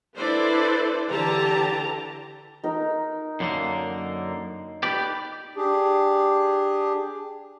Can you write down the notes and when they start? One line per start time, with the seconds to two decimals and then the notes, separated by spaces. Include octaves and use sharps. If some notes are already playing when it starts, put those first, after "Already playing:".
0.17 D4 E4 A4 B4 C5 D5
1.10 D3 E3 G4 A5 A#5
2.64 D#4 A#4
3.40 F#2 D3 A#3
4.83 G4 B4 D5 B5
5.56 D4 G4 G#4